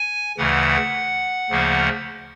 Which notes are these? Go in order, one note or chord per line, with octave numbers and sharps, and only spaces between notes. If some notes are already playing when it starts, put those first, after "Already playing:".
Already playing: G#5
D2 C#3 E3 F#5
D2 C#3 F3 A#3